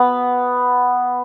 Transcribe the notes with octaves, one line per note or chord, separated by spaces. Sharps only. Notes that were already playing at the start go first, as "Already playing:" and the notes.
Already playing: B3